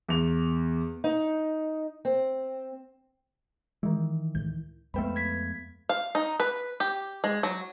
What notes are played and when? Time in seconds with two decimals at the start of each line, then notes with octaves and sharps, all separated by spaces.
0.09 E2 F7
1.04 D#4
2.05 C4
3.83 D#3 E3 G#3
4.35 C#2 A2 G6
4.94 C2 F2 G#3 A3 B3 B4 G5 B5
5.15 B3 G#6 B6
5.89 F5
6.15 D#4
6.40 B4
6.80 G4
7.24 G#3
7.43 F#3